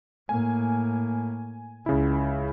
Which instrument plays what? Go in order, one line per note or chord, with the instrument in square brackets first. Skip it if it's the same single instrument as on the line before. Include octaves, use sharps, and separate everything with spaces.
[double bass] A2 A#3 [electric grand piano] G#5
[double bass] C#2 [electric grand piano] C#3 E4